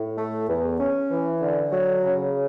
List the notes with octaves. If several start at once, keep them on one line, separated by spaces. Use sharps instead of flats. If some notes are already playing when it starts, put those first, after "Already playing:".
Already playing: A2
A3
E2
C#4
E3
D3
F#3
C#3